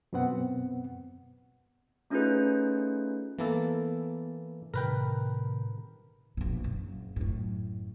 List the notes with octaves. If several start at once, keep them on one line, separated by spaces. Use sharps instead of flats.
F#2 B2 B3 C4 F#5
A3 C#4 D#4 F4 G#4 B4
E3 A#3 B3 A4
A2 C3 D#3 A#4 B4 G5
A#1 B2
F#1
F#2 A2